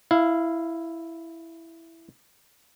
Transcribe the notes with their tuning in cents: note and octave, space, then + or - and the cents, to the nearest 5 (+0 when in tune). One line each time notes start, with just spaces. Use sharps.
E4 +0 F5 -15